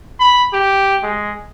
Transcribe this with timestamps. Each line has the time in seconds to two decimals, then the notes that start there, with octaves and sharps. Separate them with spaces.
0.20 B5
0.53 G4
1.03 G#3